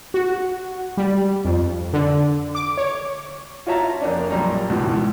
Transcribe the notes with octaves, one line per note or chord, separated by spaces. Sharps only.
F#4
G3
F2
D3
D6
C#5
F4 F#4 C#5 E5 A5 A#5
F2 A#3 C#4 D4
A#1 F#2 G3 A#5
G#1 C#2 G#2 B2 E3